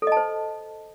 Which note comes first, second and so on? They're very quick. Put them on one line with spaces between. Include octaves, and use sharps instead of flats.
A4 D#5 A5 C5